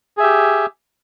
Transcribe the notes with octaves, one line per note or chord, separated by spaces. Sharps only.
G4 G#4 E5